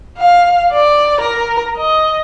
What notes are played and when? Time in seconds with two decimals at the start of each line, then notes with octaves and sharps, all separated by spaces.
0.18 F5
0.72 D5
1.21 A#4
1.77 D#5